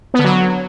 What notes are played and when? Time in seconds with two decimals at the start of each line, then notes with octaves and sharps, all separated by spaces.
0.14 B3
0.19 D3
0.24 F#3